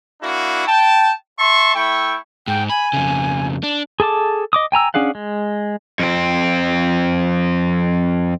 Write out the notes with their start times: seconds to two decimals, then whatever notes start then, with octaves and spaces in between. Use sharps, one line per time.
0.22 A#3 D4 E4 F#4
0.67 G5 A5
1.39 E5 A5 C6 C#6
1.75 A3 E4 G5 C#6
2.48 G#2 G5
2.70 G#5 B5
2.93 F2 C#3
3.63 D4
4.00 G#4 A4 A5 D6
4.53 D#5 D6 D#6
4.72 G5 G#5 A#5 E6
4.94 C#4 D4 G#4 F5 F#5
5.15 G#3
5.99 F2 C4